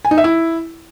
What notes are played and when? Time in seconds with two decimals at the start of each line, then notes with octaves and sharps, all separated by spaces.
0.05 G#5
0.11 D#4
0.18 E5
0.24 E4